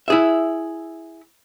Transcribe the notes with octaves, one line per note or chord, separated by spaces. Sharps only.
E4 G#4 E5